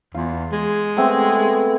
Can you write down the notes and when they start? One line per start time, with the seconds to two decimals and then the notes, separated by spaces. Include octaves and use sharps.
0.15 E2 F4
0.52 G#3
0.97 A3 B3 C4